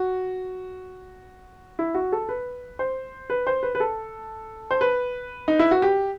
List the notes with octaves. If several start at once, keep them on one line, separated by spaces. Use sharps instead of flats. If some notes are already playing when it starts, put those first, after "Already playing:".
Already playing: F#4
E4
F#4
A4
B4
C5
B4
C5
B4
B4
A4
C5
B4
D#4
E4
F#4
G4